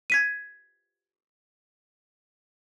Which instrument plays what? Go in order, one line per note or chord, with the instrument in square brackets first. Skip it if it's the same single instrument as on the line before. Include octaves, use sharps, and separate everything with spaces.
[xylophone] G#6 B6 D#7